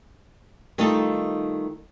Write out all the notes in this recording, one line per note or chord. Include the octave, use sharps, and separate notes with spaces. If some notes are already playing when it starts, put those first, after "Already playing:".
D#3 G3 A3 D#4 F4 A4